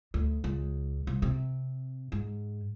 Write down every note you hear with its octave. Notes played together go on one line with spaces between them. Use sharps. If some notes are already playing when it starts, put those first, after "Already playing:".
D2
C#2
C2
C3
G#2